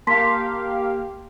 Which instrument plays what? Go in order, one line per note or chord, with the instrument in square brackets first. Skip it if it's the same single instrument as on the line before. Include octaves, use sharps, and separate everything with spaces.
[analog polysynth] A#3 G4 F5 [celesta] A5 C6 B6